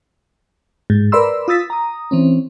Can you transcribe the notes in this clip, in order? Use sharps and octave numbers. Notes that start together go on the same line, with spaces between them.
G#2
A#4 B4 D5 B5 C6 E6
F4 D#6 E6 A6 B6
A#5 D#6
E3 C4 C#4